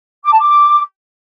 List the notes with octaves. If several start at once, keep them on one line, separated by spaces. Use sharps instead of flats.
D6
A5
D6